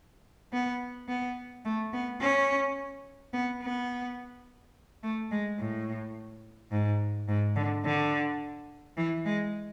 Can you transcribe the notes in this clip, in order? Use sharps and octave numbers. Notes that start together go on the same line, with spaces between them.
B3
B3
A3
B3
C#4
B3
B3
A3
G#3
A2
G#2
G#2
D3
D3
E3
G#3